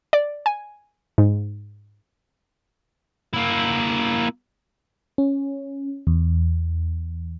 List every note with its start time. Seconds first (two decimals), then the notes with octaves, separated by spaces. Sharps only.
0.13 D5
0.46 G#5
1.18 G#2
3.34 A#3 E4
5.18 C#4
6.07 E2